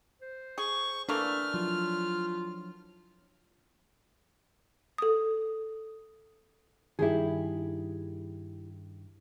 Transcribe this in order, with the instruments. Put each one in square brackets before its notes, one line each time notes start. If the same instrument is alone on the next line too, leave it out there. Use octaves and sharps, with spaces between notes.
[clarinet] C5
[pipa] G#4 [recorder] C#6
[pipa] E3 A3 A#3 [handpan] D4 [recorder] F6
[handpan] F3 F#3 E4 [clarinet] F4
[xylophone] A4 D#6
[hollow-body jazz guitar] G2 D#3 [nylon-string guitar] E4 G4 G#4